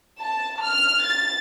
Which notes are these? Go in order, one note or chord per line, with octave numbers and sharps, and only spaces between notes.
A5
F6
A6